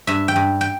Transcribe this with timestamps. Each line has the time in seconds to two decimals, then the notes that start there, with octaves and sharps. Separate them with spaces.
0.07 G2 E5
0.28 G5
0.36 G2
0.61 G5